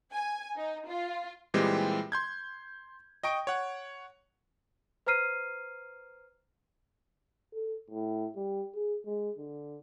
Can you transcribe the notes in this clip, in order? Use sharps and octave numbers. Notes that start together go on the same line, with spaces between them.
G#5
D#4
F4
A#2 E3 G3 G#3 C4 G4
C6 G6 G#6
D#5 G5 C#6 D7
C#5 F#5
B4 C5 A#5 F6 C7 D#7
A4
A2
G3
G#4
G#3
D3